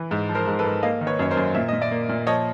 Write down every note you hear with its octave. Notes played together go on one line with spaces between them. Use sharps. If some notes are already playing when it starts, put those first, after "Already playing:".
Already playing: E3
G#2
F3
A#4 C5
G#2
A4 B4
G#2
A#3 D#5 F5
D#3
B4 C#5
F#2 C#5
A#4 C5
F#2
A#2 E5
A#2 D#5
D5 E5
A#3
A#2
F3 C#5 D#5